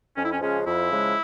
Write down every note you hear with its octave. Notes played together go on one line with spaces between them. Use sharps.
F2 C#4
E4
C#4
C#3 F3 G#3 C#4
F2 E4
C#3 F3 G#3